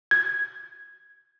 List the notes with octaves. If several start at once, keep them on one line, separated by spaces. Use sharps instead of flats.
G#6